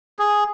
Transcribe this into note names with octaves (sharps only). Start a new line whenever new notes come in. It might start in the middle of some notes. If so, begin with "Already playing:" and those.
G#4